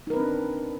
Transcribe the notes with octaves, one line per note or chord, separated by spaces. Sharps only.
C4 D4 D#4 A#4 B4